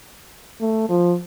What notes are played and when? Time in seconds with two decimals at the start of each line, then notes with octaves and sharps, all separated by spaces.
0.61 A3
0.89 F3